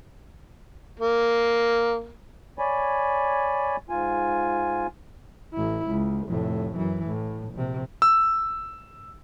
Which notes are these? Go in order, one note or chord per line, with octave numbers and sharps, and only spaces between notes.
A#3
C#5 D5 G#5 B5
G#2 F4 G#5
A1 E4
C#2
F1 A2
F#2 E3
A2
A#1 C3
E6